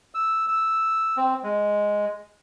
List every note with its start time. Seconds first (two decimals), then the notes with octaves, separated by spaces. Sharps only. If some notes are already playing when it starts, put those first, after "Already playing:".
0.15 E6
0.48 E6
1.17 C4
1.43 G#3